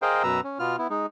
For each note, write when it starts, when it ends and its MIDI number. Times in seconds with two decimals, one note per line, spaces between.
0.02 0.23 68
0.02 0.23 70
0.02 0.23 72
0.02 0.23 75
0.02 0.23 77
0.02 0.23 79
0.23 0.41 42
0.23 0.41 47
0.23 0.41 71
0.23 0.41 82
0.23 0.41 88
0.44 0.58 61
0.59 0.76 47
0.59 0.76 59
0.59 0.76 65
0.59 0.76 89
0.78 0.87 59
0.78 0.87 64
0.90 1.06 56
0.90 1.06 63